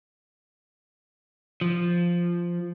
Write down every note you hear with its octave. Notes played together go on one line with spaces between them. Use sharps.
F3